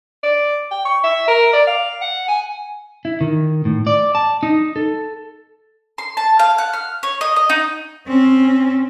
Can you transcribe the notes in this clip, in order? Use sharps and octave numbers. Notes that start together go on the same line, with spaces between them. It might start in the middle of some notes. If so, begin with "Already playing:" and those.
D5
G5
C#6
E5
A#4
D5
F5
F#5
G#5
E4
D#3
A2
D5
A5
D#4
A4
C6
A5
F5
F#5
F6
C#5
D#5
D#5
D#4
C4 C#4